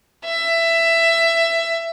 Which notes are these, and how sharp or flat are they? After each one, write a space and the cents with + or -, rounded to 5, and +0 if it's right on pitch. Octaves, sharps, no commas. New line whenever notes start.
E5 +15